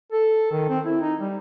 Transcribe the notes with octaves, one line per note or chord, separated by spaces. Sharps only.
A4
D#3
C4
E4
D#4
G3